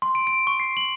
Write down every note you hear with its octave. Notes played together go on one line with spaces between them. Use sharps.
C6
D7
D7
C#6
C7
F#7